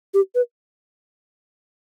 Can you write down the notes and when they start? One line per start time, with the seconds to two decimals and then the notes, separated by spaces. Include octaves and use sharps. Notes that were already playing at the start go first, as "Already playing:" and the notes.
0.14 G4
0.35 B4